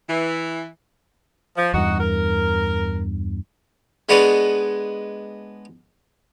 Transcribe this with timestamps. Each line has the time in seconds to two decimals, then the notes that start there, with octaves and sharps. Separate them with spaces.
0.07 E3
1.57 F3
1.74 E2 G2 D#4 F#4
2.00 A#4
4.09 G#3 B3 D4 B4 C#5 D#5